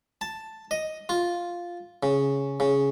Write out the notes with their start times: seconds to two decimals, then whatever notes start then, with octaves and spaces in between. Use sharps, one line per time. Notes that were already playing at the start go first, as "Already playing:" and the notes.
0.21 A5
0.71 D#5
1.09 F4
2.03 C#3
2.60 C#3